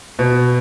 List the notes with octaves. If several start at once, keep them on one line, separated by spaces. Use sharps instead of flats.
B2